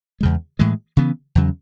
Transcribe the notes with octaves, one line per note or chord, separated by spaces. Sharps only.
E2 C#3 G#3
A2 E3 G#3
C#3 E3 B3
E2 C#3 F#3